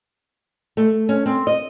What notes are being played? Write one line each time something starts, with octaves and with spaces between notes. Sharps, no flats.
A3
C#4
C4
D#5